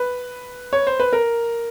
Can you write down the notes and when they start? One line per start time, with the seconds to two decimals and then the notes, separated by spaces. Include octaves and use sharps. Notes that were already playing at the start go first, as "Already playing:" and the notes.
Already playing: B4
0.73 C#5
0.87 C5
1.00 B4
1.13 A#4